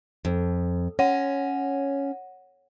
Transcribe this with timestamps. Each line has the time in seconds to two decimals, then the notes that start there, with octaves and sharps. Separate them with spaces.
0.25 F2
0.99 C#4 C#5 F#5